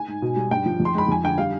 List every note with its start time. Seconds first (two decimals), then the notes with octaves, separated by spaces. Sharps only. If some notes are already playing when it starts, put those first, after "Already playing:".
Already playing: G#5
0.08 G#2
0.22 B2
0.36 G3
0.51 G2 G5
0.66 F3
0.80 F2
0.85 C6
0.95 G#3 B5
1.08 F2 G#5
1.23 D3 G5
1.38 G3 F5